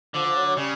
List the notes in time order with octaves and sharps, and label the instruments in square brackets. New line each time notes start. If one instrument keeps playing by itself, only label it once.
[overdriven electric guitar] D3 [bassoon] F3
[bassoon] F3
F#3
F#3
[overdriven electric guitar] C#3 [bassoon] G3